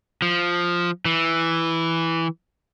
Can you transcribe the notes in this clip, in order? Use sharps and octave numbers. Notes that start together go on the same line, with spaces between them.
F3
E3